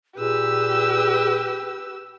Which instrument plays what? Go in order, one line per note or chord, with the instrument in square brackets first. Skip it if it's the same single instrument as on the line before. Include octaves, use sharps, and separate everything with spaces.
[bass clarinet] A#2 [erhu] G4 [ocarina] G#4 [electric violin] B4 E6